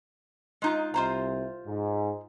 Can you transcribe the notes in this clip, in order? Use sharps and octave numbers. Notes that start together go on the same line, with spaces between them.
G#3 D#4 F4
C2 C3 F4 C5 A#5
G#2